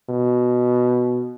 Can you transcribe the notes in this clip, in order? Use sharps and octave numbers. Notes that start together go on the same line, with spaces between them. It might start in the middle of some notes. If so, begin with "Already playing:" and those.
B2